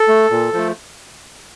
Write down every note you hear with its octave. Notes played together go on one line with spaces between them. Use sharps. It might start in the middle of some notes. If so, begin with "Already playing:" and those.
Already playing: A4
A3
A#2
F3 A3